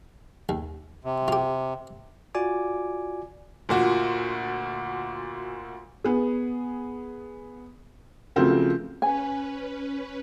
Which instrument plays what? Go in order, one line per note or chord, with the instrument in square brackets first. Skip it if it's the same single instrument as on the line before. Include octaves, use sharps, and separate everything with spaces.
[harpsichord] D#2
[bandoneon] C3
[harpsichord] F4 G4
[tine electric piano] F4 F#4 D5 G#5 D6
[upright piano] D2 A#2 F#4
[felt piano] B3 G#4
C#3 F3 F#3 A3 C4 A#4
[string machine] C#4 B4 [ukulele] G#5